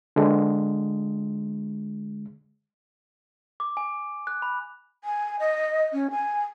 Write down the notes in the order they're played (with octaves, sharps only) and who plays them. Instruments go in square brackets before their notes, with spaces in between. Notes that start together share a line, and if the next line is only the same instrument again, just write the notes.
[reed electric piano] D3 G#3
[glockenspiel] D6
G#5
F#6
B5
[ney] G#5
D#5
C#4
G#5